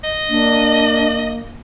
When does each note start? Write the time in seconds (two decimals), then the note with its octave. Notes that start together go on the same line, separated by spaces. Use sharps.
0.04 D#5
0.29 A#3 D4